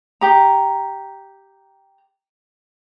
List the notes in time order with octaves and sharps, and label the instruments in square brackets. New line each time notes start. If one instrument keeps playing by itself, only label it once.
[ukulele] G4 A#5